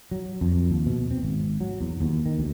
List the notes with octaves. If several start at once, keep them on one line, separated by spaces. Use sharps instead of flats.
F#3
F2
D#2
B2
C4
G#1
F#3
E2
D#2
D#3
D2